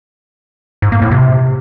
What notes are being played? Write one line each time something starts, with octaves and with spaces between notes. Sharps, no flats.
G#2
A#3
A2
C3